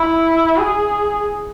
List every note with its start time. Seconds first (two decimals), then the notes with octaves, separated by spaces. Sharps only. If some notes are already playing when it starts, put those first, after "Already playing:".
Already playing: E4
0.57 G#4